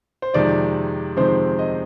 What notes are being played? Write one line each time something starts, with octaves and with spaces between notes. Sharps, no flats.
C5
F2 C3 D#3 G#3 C4 D5
F2 C3 D#3 G#3 C4 C5
D#5